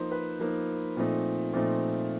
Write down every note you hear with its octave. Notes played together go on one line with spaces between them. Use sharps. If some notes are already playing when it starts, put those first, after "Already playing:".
Already playing: F3 A#3 D#4 C5
B4
F3 A#3 D#4
A#2 F3 A3 C4 D#4
A#2 F3 A3 C4 D#4